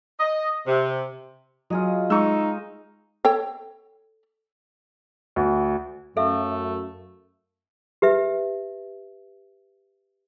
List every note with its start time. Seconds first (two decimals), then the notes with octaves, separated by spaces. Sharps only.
0.20 D#5
0.67 C3
1.70 F#3 F4 G#4 D#5
2.10 G#3 D#4 C#6 E6
3.25 A4 C#5 G5
5.36 D2
6.17 F#2 A3 A4 E5 F5
8.02 G4 B4 E5